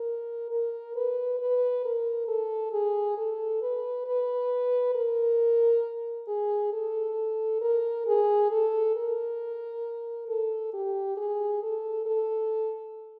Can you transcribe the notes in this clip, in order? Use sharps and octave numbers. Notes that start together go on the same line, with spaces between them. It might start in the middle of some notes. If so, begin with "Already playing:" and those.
Already playing: A#4
A#4
B4
B4
A#4
A4
G#4
A4
B4
B4
A#4
G#4
A4
A#4
G#4
A4
A#4
A4
G4
G#4
A4
A4